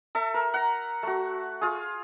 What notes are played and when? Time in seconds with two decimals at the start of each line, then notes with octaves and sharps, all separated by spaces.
0.15 A4 E5
0.34 A#4
0.54 F#5 A#5
1.03 A3 F#4
1.61 F4 G#4